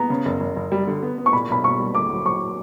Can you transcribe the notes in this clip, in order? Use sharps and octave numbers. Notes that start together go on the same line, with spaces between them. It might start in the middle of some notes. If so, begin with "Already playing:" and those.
Already playing: B3 A#5
C#3
F#1
F#1
F#1
G3
D3
B3
B3
C#6
A#2 B5
B1 B5
B1 C#6
G3
D2 D6
F#3
F#3 C#6